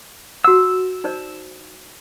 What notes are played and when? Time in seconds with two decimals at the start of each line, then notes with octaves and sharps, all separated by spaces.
0.44 F#4 F#5 E6
1.04 D#4 C5 D5